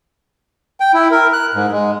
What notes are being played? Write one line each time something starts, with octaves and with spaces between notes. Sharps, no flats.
G5
E4
A#4
F#6
G#2
G#3